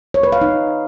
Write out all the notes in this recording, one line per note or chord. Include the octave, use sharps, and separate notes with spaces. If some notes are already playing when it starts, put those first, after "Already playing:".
C#5
B4
F5
D#4